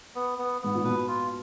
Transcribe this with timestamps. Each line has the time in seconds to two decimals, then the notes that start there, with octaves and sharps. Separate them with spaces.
0.15 B3
0.38 B3
0.61 G#2 B3
0.75 A#2
0.85 B2 B4
1.08 F4